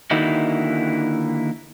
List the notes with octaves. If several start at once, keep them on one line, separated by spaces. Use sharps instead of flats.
D3 D#3 A#3 D#4 E4 F#4